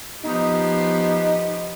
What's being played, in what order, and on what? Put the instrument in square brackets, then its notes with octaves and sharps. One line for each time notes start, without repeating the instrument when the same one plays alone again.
[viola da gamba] F3 B3 G4 [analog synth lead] D#4